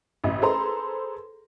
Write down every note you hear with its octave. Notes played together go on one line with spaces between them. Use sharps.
A1 D#5 E5
G#4 A4 B4 C5 A#5 C6